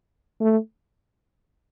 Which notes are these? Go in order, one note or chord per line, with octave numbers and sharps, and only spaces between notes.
A3